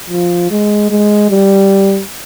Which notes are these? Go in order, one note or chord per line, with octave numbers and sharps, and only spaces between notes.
F3
G#3
G#3
G3